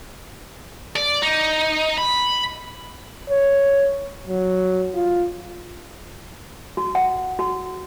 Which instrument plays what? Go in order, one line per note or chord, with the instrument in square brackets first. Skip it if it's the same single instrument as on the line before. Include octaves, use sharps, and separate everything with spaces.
[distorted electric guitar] D5
D#4
B5
[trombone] C#5
F#3
F4
[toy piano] F#4
F#5
F#4